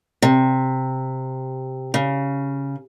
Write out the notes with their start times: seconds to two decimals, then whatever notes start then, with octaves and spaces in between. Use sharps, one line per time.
0.22 C3
1.94 C#3